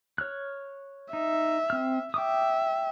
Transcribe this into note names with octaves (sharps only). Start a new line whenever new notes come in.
C#5 F6 F#6
D#4 E5
C4 F6
E5 G5 D6 D#6